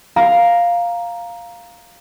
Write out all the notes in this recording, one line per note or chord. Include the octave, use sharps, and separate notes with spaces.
F5 A#5 A#6